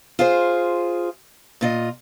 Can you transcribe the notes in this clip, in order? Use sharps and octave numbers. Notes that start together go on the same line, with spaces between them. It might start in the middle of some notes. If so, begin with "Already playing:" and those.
F4 G#4 C5
A#2 F4 D#5